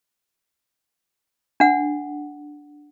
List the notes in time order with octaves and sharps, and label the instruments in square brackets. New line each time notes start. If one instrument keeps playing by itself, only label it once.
[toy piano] D4 F#5